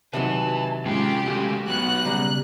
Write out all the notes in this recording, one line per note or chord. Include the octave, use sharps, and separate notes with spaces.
C3 D#3 F#3 B4 E5 A5
G#3 C#4 F4 G4
G#3 A3 C#4 F#4
F#3 B3 F#6
C#3 G3 A#5